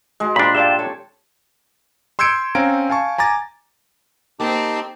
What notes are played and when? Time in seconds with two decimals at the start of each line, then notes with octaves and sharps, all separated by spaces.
0.20 G#3 D#4 F#4
0.36 A#2 D4 G4 C5 B5 C6
0.54 G#4 D5 E5 F5 G5 A5
0.79 A4 C#5
2.19 C6 E6 G6 G#6 C#7 D7
2.55 C4 C#4 F5 A#5 D7
2.90 F5 G#5 A5 C#6
3.18 G#5 A#5 D6 A6
4.40 A#3 C4 D#4 G4 A5